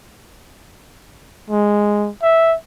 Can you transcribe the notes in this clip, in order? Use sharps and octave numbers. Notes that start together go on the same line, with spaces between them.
G#3
E5